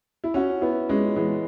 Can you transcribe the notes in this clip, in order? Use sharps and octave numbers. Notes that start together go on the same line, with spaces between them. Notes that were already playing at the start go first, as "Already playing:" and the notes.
E4
C#4 F#4
B3 E4
G#3 C#4
E3 G#3